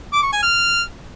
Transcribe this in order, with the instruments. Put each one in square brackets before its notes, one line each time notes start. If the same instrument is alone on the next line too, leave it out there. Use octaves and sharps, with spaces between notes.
[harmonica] D6
C#6
G#5
F6